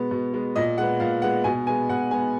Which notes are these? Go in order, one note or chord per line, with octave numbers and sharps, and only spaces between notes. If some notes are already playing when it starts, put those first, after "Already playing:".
Already playing: B2 G#3 B3
B2
G#3 B3
A#2 D#5
G#3 B3 F#5
A#2 F5
G#3 B3 F#5
B2 G#5
G#3 B3 G#5
B2 F#5
G#3 B3 G#5